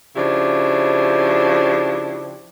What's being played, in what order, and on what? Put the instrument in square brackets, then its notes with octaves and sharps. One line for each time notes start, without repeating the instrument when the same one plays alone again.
[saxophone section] C#3 F3 D4 E4 G4